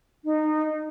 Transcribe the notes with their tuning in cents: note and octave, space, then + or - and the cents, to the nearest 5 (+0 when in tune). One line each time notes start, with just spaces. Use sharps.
D#4 -20